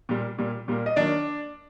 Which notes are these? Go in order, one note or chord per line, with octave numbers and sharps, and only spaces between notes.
A#2 G3 A#3
A#2 G3 A#3
A#2 G3 A#3
D#5
D#3 F#3 A#3 D4 D5